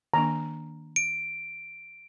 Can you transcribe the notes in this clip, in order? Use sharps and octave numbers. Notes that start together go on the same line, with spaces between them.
D#3 A#3 D4 A#5
D7